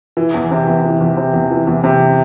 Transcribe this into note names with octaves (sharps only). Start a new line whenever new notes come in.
E3
E2
C3
E2
E3
E2
C3
E2
E3
E2
C3